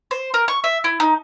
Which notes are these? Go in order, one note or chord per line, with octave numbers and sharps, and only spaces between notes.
C5
A#4
C#6
E5
E4
D#4